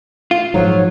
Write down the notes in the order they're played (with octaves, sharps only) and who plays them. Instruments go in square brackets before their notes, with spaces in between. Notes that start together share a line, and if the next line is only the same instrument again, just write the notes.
[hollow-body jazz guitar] F4
[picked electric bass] G#2 F3 [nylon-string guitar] F#3 [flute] C#5